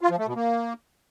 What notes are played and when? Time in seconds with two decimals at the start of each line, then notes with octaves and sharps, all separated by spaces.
0.01 F4
0.10 F3
0.18 A3
0.27 B2
0.36 A#3